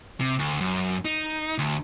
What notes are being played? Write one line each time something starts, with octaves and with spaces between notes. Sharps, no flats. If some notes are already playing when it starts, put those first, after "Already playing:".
C3
D2
F#2
D#4
D2